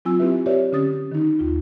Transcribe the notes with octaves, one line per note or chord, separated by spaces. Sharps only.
F#3 C4 F4 G#5 E6
A#3 C4 E4 G4 B4 E5
G4 B4 C#5 D5 E5
D3 C#4 G4 D#6 A6
D#3 D#4
D#2 F4